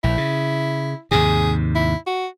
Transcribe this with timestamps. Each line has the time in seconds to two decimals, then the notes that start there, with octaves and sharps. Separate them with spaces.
0.04 A#1 E4
0.18 C#3
1.11 D#2 G#2 C3 G#4
1.75 E4
2.07 F#4